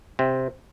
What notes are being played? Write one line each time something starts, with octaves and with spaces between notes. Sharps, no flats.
C3 C4